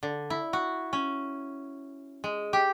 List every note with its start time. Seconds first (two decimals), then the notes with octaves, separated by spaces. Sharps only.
0.03 D3
0.30 E4
0.53 F#4
0.93 C#4
2.24 G#3
2.53 G4